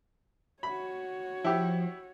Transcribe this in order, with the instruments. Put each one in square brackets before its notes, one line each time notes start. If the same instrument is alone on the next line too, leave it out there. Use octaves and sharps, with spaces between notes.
[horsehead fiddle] F#4 C#5 [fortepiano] B5
[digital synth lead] F3 [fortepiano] E4 G4